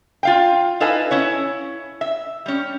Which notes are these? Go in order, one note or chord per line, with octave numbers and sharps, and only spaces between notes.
F4 F5 G5
D#4 E4 A4 B4 F5 G#5
C#4 E4 C#5
E5
G3 C#4